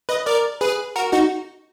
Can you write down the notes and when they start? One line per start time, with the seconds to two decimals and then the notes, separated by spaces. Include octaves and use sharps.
0.09 B4 D#5
0.26 A#4 D5
0.61 G#4 B4
0.96 F#4 A#4
1.13 D#4 F#4